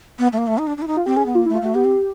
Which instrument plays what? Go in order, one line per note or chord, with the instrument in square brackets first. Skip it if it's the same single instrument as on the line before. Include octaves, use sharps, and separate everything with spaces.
[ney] B3
A3
A#3
A3
D#4
D4
D4
E4
D#4
[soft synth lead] F4
[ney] C4 [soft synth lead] G4
[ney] C#4 [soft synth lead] G#4
[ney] B3
[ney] A#3 [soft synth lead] F4
[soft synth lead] E4
[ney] A3
[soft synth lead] F4
[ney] A3 [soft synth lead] F#4
[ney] B3 [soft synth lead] G4
[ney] C4